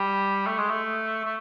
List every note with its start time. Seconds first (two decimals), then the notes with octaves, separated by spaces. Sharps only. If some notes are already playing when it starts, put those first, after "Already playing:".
Already playing: G3
0.47 A3
0.58 G#3
0.69 A3
1.24 A3